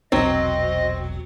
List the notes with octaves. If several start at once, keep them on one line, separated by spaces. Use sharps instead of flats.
E1 A#1 B2 F#3 C4 D#5